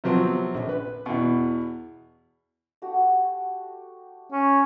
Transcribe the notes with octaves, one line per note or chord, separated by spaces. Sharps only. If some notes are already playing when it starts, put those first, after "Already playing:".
C3 F3 F#3 B3 C4
A#1
B4
E2 B2
A3 F#4 G4
C#4